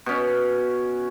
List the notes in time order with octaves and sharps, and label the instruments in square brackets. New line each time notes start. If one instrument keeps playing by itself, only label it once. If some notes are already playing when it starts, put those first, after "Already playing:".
[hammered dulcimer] B2 C#4